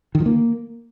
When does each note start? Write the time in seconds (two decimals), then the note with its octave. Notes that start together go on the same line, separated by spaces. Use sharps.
0.15 D#3
0.20 F3
0.26 A#3